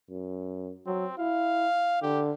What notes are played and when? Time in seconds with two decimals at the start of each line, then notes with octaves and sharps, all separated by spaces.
0.10 F#2
0.86 F#3 C4
1.18 E4 F5
2.02 D3 G4